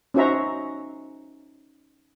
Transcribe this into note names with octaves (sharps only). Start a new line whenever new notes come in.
C#4 D#4 F#4 C5 E5 A#5